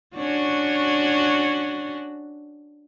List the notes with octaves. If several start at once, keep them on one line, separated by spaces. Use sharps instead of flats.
C#4 D4 F#4